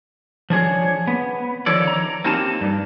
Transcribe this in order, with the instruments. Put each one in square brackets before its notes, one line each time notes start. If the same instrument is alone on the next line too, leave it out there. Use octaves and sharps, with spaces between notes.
[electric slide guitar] F3 D4 G#4 C#5
B3
D3 D#3 F3 A4 C#5 D5
A#5
A#3 C4 D#4 G4 A5
G2